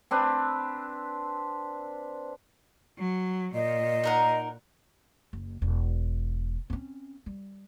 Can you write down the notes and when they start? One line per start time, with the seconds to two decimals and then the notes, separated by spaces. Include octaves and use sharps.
0.11 C4 D4 B4
2.99 F#3
3.54 A#2 D#5
4.04 D#4 A#4 F#5
5.33 F#1
5.62 E1
6.70 C4 C#4
7.26 G3